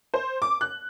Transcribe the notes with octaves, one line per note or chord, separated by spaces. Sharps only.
C5
D6
F#6